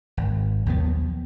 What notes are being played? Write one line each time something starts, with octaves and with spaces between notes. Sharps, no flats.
G#1
A#1 D#2 F#3 B3